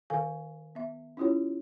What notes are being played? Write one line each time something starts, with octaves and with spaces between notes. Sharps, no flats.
D#3 A4 A#4 F5 G#5
B3 E5
C#4 E4 F4 G4 C#5